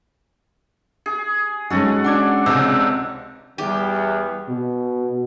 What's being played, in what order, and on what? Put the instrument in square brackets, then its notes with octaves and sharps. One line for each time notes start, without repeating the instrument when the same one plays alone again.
[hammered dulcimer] G#4
[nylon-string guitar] G#3 C#4 D#4 [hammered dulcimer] F#4 A4
[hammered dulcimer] D4 [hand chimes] F#5 D6 G#6
[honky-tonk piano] C#2 C3 [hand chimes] E6
[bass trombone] E2 [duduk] G3 [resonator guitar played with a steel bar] G4
[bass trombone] B2